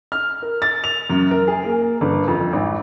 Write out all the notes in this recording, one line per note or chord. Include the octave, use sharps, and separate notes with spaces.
F6
A#4
A6
F7
F#2
A#4
G#4
A#3
G1
F2
G#1